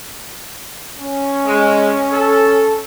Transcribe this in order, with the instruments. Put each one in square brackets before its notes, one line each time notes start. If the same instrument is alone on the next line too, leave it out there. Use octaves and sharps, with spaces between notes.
[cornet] C#4
[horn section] G#3
A4